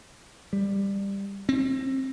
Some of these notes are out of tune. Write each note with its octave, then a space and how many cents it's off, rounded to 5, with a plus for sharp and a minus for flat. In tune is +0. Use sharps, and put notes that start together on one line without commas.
G3 +15
C4 +25